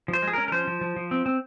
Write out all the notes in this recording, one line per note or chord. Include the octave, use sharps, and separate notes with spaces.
F3
C5
G#3
G#4
C#4 A#4
A#4
F3 C5
F3
F3
F3
C4
C4